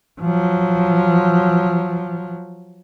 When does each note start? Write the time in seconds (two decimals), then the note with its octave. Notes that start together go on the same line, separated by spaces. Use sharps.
0.21 F3 F#3